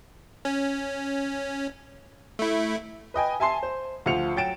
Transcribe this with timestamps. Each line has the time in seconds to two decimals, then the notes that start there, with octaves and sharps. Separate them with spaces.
0.45 C#4
2.39 A3 E4
3.14 B4 D#5 G5 G#5
3.40 E5 G#5 A5 C6 C7
3.63 C5
4.06 D2 F3 F4 C#7 F7
4.36 F#3 G5 A6 D7 E7